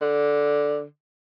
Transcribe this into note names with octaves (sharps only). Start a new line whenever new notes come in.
D3